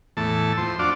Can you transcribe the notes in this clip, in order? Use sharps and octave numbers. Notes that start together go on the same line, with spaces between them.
E2 A2 A5
F2 C5
D4 F4 F#4 D5